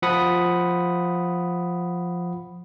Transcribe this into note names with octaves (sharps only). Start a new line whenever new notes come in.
F3 F#5 B5 D#6